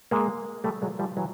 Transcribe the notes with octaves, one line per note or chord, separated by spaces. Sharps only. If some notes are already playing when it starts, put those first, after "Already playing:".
G#3 A#3
G3 A3
F#3 G#3
F3 G3
E3 F#3